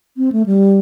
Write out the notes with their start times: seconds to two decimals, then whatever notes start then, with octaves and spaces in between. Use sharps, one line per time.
0.17 C4
0.32 A3
0.46 G3